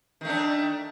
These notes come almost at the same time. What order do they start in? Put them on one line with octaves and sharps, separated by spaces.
D#3 A3 D4